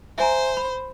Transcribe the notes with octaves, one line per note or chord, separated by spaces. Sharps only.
C5 E5 G#5 A#5
B5